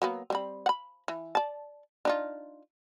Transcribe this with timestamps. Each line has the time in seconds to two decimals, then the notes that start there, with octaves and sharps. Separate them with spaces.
0.02 F#3 A#3 B3
0.30 G3 C4 B5
0.66 F#5 B5
1.08 E3
1.35 D5 A5
2.05 D4 D#4 F4